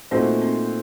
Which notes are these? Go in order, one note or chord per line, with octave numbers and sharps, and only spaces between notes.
A#2 A3 C4 D#4 F#4 C5
C4